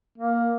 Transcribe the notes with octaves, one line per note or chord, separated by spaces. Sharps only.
A#3